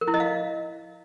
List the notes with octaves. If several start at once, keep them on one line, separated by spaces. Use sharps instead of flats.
A#4
E4
D#5
F5